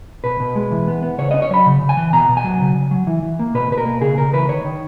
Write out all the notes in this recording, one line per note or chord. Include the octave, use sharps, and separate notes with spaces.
B2 B4
B2
G#3
E3
B3
B3
C#3 C#5
C#4 D#5
C#5
F#3 B5
C#3
C#3
G#5
E3
B2 A#5
B2
G#5
F#3
C#3
C#3
F#3
E3
E3
A#3
B2 B4
B2 B4
A#4
A#3
C#3 G#4
C#3 A#4
E3 B4
D#3 C#5
D#3